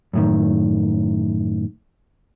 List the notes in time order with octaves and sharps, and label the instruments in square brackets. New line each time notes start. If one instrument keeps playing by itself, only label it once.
[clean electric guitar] F#2 A2 D#3